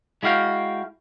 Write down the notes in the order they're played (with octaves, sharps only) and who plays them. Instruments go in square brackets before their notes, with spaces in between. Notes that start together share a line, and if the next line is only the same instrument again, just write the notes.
[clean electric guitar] G#3 E4 F#4 F5 G5